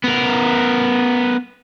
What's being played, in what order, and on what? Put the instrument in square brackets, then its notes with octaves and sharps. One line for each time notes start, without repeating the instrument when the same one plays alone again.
[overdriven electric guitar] B3 A#4